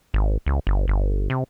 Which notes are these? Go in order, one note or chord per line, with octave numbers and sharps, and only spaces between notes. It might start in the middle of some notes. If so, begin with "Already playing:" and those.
G#1
C#2
G1
G1
C3